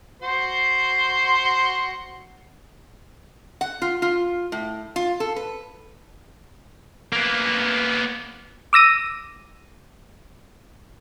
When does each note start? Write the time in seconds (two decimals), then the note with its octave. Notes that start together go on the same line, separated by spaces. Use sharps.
0.22 F#4 C5 C6
3.61 F#5
3.82 F4
4.02 F4
4.52 A2
4.96 F4
5.20 A4
5.36 B4
7.13 A#3 B3
8.73 D6 E6 A#6 D#7